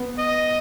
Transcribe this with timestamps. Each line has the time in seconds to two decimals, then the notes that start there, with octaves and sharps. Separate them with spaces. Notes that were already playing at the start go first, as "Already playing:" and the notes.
Already playing: B3
0.19 D#5